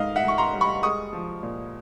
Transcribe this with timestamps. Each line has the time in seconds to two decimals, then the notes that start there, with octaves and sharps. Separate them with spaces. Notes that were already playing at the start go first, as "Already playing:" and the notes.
Already playing: G#2 D#3 D#5 F5
0.16 E5 F#5
0.23 G#2 C#6
0.38 A#5 C6
0.53 G3
0.61 B5 C#6
0.83 G#3 C#6 D#6
1.13 F3
1.43 A#2